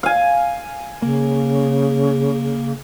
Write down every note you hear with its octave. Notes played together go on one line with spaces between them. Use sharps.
F5 G#5
C#3 A#3